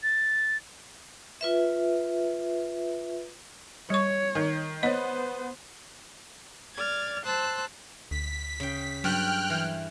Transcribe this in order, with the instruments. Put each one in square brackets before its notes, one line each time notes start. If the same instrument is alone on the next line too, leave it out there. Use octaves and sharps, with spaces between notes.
[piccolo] A6
[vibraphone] F4 B4 E5
[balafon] G3 C#6 [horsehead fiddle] C#5
[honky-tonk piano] D#3
[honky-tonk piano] B3 [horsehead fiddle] C5 [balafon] C#5 D#5
[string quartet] D5 F6 G#6 A6
C5 A5 C6 E6 F#6
[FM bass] D2 [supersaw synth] B6
[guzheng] C#3 G5
[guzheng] G2 [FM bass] F#3 [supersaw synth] G5 F6 F#6
[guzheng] E3